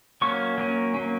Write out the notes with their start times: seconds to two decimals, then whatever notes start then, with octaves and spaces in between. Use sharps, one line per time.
0.22 F#3 A#3 C#4 C#6
0.58 F#3 A#3 C#4
0.94 F#3 A#3 C#4